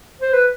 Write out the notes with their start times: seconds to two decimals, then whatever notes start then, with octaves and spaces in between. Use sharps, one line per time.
0.22 C5
0.33 B4